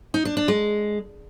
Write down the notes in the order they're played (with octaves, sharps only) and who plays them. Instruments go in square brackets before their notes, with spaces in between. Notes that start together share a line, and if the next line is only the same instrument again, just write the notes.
[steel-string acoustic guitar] D#4
D4
D4
G#3